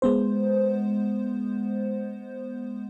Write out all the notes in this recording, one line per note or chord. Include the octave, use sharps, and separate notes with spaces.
G#3 B3 C5